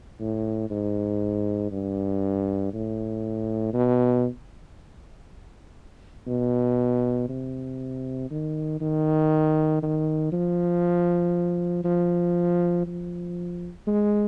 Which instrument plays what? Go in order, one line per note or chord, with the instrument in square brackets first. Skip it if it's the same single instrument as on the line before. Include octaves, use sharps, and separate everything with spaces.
[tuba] A2
G#2
G2
A2
B2
B2
C3
D#3
D#3
D#3
F3
F3
F3
G#3